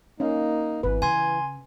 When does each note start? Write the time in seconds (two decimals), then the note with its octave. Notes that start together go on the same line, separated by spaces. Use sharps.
0.20 A#3 C#4 D#4 F5
0.83 G#1 E3 B4
1.02 C#3 G#5 C6 G#6